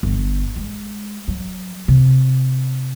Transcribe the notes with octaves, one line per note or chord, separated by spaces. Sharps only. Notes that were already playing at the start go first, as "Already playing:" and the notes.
G1
G#3
F#3
C3